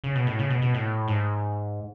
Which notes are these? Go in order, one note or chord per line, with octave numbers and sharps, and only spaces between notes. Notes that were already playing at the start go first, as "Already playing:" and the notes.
C#3
B2
A2
C#3
B2
B2
A2
G#2